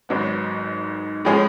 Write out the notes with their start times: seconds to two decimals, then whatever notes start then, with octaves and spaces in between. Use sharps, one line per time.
0.09 G#1 G#2 F#3 B3
1.25 A2 F3 G#3 C#4 G#4